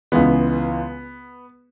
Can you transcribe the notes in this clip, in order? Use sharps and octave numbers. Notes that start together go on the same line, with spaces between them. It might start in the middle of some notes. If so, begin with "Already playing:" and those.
C#2 C#3 E3 G#3 B3